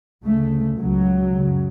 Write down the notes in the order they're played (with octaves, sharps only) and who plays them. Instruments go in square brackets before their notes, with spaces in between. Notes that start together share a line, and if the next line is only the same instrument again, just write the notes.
[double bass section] D2 C#3 A3
C#2 C#3 F#3
F#2 C#3